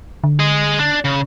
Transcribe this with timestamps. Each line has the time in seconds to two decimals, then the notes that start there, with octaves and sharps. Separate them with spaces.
0.24 D3
0.39 G#4 D#5
0.79 D4
1.05 C#3